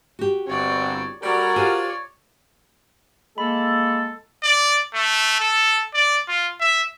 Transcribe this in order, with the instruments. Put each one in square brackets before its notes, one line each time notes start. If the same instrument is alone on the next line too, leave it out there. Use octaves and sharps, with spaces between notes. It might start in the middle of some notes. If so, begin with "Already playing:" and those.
[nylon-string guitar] F#4 G4
[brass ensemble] G1 C4 [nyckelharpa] C#5 D5
[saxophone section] G3 [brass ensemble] F#4 A4 A#4 [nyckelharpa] C#5 D5
[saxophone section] D4 F4 [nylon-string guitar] G4 C5 G#5
[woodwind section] G#3 A#3 A4 [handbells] B5
[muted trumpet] D5
A3
A4
D5
F4
E5